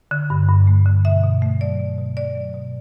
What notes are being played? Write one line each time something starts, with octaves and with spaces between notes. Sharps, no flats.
D3
G2
G2
A3
D3
B2 E5
B2
A3
F#3 D5
B2
B2
A3 D5
F#3
B2